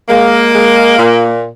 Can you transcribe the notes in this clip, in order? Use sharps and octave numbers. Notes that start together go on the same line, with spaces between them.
G#3 A#3
G#3
A#2